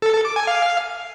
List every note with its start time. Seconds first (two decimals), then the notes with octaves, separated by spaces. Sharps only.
0.02 A4
0.14 A4
0.25 D6
0.36 G#5
0.47 F5